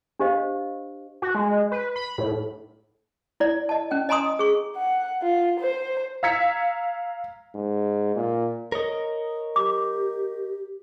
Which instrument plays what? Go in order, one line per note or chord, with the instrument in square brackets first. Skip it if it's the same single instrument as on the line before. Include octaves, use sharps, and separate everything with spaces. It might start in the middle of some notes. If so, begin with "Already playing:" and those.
[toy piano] D4 G4 C5 D#5 F5
[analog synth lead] F#4
G#3
B4
B5
A2
[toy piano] E4 D5
D#5 A5
C#4 G5
D#5 G#5 A#5 C6 D#6
G#4 C#6
[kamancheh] F#5
F4
C5
[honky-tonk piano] F5 A#5 E6 G#6 B6 C#7
[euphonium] G#2
A#2
[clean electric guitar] A#4 C#5 D#5
[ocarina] G4 [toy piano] D6